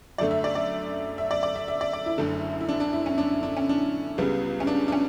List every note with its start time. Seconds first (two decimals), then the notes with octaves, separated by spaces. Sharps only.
0.18 F#2 D3 A3 D5
0.31 E5
0.44 D5
0.55 D5
1.18 E5
1.31 D5
1.43 D5
1.56 E5
1.68 E5
1.81 D5
1.93 D5
2.06 E4
2.18 F#1 F#2 D3 A3
2.61 E4
2.69 D4
2.80 D4
2.93 E4
3.06 C#4
3.18 D4
3.43 D4
3.57 C#4
3.69 D4
4.18 C#2 C#3 G3 B3
4.60 C#4
4.67 D4
4.88 D4
4.92 C#4